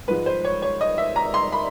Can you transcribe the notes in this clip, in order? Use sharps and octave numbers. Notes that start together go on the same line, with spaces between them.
G#2 F3 G#3 B4
C5
C#5
C#5
D#5
E5
A#5
C6
B5